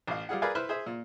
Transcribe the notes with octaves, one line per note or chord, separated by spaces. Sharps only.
A1 F5
G3 F4 G#4 F#5
G#4 A#4 B4 D5 F5 G#5
E4 B4 C5 B5 F6 F#6
G#4 C5 E5
A#2